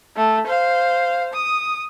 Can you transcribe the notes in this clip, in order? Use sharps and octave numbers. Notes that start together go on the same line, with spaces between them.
A3
C5 F5
D#6